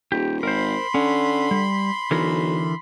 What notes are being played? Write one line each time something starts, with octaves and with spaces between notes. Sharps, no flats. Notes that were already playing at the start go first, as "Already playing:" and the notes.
D#1 G4
G#1 A#4 C5 B5 C6
D3 C#4
G3
B1 D3 E3 A#4